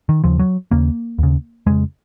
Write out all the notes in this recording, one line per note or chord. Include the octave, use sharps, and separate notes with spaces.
D#3
D#2 C#3 F3
F#3
D#2 C#3 A#3
D#2 C#3
F2 C#3 G#3